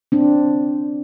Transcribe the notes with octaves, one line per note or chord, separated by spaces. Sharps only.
C4 D4